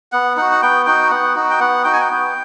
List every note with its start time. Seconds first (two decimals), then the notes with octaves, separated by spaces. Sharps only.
0.12 B3 F#5
0.37 D#4 F#4 F#5
0.51 F#5
0.62 B3 G5
0.86 D#4 F#4 G5
1.11 B3 F#5
1.35 D#4 F#4
1.50 G5
1.60 B3 F#5
1.84 D#4 F#4 G5
1.93 G#5
2.00 G5
2.09 B3